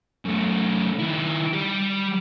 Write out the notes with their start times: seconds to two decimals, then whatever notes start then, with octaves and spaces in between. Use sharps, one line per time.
0.25 F#2 A3
1.00 D#3 E4
1.53 G3 G4